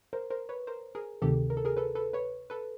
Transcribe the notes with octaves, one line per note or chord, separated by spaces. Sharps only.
A#4 C5
A#4 C5
B4 C#5
A#4 C5
G#4 A#4
D2 C3 D#3 G4 A4
A#4
A4
G#4 A#4
A4 B4
A4 B4
B4 C#5
A4 B4